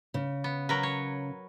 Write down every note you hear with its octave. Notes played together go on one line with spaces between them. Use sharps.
C#3
B3
F#3 A#4 B4
C#5